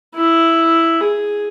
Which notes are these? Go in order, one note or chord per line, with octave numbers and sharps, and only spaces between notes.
E4
G#4